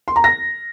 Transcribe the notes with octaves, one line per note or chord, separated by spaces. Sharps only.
C6
A#5
A#6